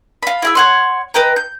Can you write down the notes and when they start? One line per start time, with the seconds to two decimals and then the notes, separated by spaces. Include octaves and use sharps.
0.23 F4 B5
0.42 E4 G#4 E6
0.55 C#5 F#5 C6
1.14 B4 D#5 G5 A#5
1.36 G6